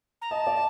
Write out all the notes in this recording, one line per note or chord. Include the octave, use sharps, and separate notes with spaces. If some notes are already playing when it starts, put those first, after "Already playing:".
A#5
D#5 A5
D5